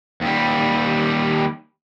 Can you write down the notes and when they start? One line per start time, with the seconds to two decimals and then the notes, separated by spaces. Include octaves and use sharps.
0.21 D#2 G3